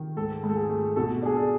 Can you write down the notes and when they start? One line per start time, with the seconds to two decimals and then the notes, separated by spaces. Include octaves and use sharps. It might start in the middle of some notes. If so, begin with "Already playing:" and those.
Already playing: D#3
0.17 G#2 A4
0.43 G#2
0.50 A4
0.56 G#4
0.69 A3
0.96 B2 A4
1.22 D4 G#4
1.36 A4